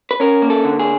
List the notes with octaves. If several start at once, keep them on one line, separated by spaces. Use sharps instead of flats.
B4
C#4 A#4
A#3
A4
D3
G#4